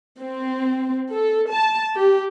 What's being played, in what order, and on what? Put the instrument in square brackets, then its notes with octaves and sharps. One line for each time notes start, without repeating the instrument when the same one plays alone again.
[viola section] C4
A4
A5
G4